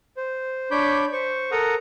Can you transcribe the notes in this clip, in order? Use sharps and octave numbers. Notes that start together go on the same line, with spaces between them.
C5
D4 C#5 B5 D6 G6
C5 C#6
A4 A#4 F#5 A#5 D#6